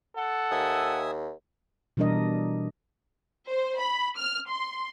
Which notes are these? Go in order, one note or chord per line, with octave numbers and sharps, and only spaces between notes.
A4 F#5
D#2 E5 G#5 D#6
B2 E3 G3 D4 A#4 D#5
C5
B5
F6
C6